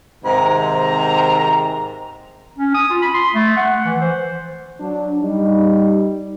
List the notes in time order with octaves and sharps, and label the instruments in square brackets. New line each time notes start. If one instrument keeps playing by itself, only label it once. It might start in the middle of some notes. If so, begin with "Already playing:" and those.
[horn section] G#2 C3 D#3 A#5
[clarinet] C#4
D#6
F4
B5
C6
A3
F#5
E3
C5
[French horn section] F#3 D4
[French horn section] G3 [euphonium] D#4